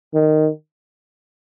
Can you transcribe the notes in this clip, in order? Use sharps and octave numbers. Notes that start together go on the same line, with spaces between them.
D#3